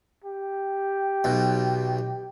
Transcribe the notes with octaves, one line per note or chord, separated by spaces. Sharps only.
G4
B1 B2